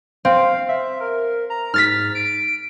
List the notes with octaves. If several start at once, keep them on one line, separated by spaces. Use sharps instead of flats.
C4 F5
E5
A#4
A#5
G#2 F6 A6 B6
D7